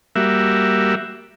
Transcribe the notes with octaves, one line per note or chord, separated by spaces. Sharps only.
G3 A#3 F#4 E5